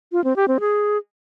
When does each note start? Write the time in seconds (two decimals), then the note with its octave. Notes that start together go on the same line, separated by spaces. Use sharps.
0.12 F4
0.24 C4
0.36 G4
0.48 C4
0.60 G#4